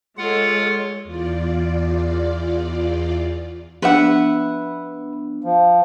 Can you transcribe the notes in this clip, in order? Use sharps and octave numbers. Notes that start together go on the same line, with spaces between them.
G#3 F4 A4 C#5 F#5
E2 F4 D5
F3 B3 D4 B4 E5 F#5
F3